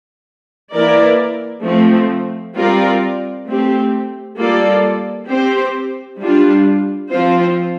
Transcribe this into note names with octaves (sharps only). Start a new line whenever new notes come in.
E3 A#3 E4 A#4 D5
F3 A3 C4
G3 C4 F4 A#4 D5
A3 C4 G4
G3 A#3 F4 A4 D5
C4 G4 C5
G3 D4 F4
F3 C4 F4 C5